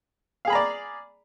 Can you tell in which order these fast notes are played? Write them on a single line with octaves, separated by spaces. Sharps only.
F5 G#4 B5 A#5 D5